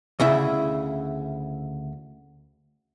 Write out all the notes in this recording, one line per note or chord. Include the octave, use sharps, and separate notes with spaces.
D2 C#3 E4 E5